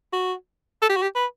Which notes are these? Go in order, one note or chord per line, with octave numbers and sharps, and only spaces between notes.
F#4
A4
G4
F#4
G4
B4